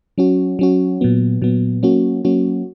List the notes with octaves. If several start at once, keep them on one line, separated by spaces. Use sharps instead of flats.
F#3 C#4 F#4
F#3 C#4 F#4
A#2 F#3 B3
A#2 F#3 B3
F#3 A#3 C#4 F#4
F#3 A#3 C#4 F#4